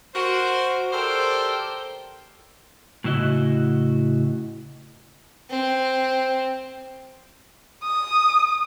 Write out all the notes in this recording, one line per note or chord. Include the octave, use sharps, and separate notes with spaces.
F#4 A#4 C5
G4 A4 A#4 C5 D5 G5
A2 C#3 E4 F#4 D#5
C4
D#6